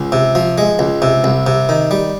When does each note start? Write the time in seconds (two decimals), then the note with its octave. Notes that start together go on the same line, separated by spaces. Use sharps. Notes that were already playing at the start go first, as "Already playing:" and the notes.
Already playing: C#2
0.12 C3
0.35 F3
0.58 G#3
0.79 C#2
1.02 C3
1.24 C2
1.47 C3
1.69 D#3
1.91 G3